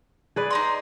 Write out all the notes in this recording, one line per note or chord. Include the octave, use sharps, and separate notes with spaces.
G#4 B4 D5
D#4 A#5 C6